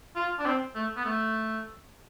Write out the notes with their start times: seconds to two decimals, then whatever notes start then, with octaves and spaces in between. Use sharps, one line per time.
0.16 F4
0.39 D4
0.46 C4
0.75 A3
0.97 B3
1.05 A3